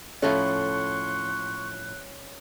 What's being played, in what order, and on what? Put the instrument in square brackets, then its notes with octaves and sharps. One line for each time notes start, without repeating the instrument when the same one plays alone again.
[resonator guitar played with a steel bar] A2 F3 A4 [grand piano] C#4 [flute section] C6 C#6 [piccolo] F#6